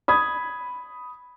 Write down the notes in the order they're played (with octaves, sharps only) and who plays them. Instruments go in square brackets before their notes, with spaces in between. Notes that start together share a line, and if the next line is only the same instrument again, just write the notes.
[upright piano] B5 D#6 G#6